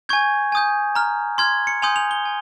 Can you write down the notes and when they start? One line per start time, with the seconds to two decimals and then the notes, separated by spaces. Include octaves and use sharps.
0.09 G#5 C#6 G6 G#6
0.52 G#5 D#6 G6
0.95 A#5 F6
1.38 C6 F6 G#6
1.67 C#7
1.82 G#5 C6 D#6 G6 F7
1.96 F7
2.11 G7
2.25 G#5